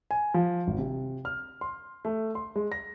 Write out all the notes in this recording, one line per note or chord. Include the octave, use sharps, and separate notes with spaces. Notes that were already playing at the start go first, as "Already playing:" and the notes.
G#5
F3
G#1
C3
F6
C6
A3
C6
G#3
A#6